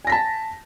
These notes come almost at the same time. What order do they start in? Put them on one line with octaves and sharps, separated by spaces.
G#5 A#6 B6 A5